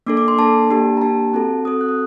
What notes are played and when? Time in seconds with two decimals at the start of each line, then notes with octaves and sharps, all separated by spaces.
0.06 A#3 D4 A4 D6
0.17 D6
0.28 C6
0.38 A#3 D4 A4 A5
0.70 A#3 D4 G4
0.97 A#5
1.01 A#3 D4 G4 A5
1.33 C4 F#4 A4
1.65 C4 F#4 A4 D#6
1.81 F#6
1.89 D#6